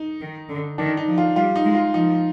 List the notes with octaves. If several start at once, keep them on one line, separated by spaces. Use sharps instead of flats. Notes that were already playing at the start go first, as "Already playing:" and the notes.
Already playing: D#4
D#3
D3
D#3 D4
D#4
F3
F4
G3 F4
D#4
G#3
F4
F3 D#4